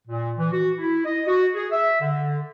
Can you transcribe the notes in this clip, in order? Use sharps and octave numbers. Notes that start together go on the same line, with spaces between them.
A#2
E3
F#4
E4
D#5
F#4
G#4
E5
D3